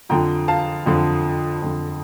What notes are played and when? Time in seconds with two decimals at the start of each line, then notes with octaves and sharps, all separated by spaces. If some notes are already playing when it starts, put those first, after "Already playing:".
0.09 F2 D3 F3 G5 A#5
0.48 F5 A5
0.86 F2 D3 F3
1.62 F2 D3 F3